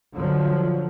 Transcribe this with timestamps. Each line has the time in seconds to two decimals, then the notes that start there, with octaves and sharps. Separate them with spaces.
0.15 D3 F3 F#3